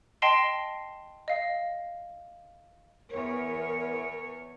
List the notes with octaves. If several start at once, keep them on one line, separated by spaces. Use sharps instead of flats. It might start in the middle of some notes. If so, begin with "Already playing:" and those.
D#5 G5 A5 C6 C7 D7
D#5 F5
E2 A#4 C#5